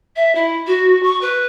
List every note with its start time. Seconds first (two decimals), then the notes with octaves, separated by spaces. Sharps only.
0.15 E5
0.35 E4
0.66 F#4
1.02 C#6
1.21 B4